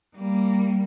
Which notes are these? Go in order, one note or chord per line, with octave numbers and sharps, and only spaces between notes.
G3 A#3